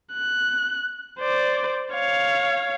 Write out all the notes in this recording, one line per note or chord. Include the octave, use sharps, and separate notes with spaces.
F#6
C5 D5
C#5 F5